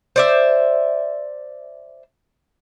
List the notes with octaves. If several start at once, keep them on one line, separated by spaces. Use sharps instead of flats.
C5 D5 E5